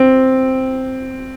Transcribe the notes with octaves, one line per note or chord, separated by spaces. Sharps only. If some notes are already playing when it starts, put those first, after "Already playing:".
Already playing: C4